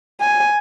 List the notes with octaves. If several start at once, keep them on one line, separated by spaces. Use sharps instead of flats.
G#5